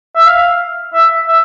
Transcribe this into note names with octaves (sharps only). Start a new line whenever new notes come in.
E5
F5
E5
E5